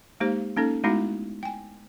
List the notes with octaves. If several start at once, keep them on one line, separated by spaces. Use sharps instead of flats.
G#3 A#3 D#4 G4 C5
A#3 C#4 D#4 A4
G#3 A3 B3 D#4 E4 F#4
G5 G#5